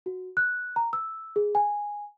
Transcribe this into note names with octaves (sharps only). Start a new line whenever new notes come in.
F#4
F#6
A#5
E6
G#4
G#5